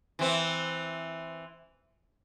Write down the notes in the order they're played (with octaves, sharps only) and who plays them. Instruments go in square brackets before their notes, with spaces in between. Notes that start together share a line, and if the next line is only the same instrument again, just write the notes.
[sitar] E3 C4